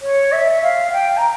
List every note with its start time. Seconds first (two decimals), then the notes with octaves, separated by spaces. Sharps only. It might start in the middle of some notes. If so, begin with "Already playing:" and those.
0.02 C#5
0.32 E5
0.62 F5
0.93 G5
1.17 A#5